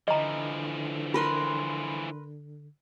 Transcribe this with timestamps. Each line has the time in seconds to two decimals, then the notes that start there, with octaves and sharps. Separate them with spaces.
0.08 D3 E3 F3 D#5 A#5
1.14 F4 A#4 B4 C6